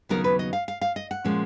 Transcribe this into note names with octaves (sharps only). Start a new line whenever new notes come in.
D#2 C#3 F#3 B3 D#4 A#4
B4
D#5
F5
F5
F5
D#5
F#5
A#2 F3 G#3 C#4